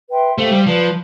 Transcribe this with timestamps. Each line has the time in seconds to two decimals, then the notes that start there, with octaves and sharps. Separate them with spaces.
0.09 B4 E5 G5 C6
0.37 A3 G4 C5 F5
0.52 G3
0.66 F3 B4 D5 A5